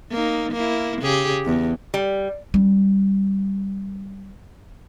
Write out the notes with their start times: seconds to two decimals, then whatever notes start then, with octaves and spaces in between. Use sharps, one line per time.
0.11 A#3 D#4
0.52 A#3 E4
1.02 C#3 G4 G#4
1.45 E2
1.94 G3
2.54 G3 C#4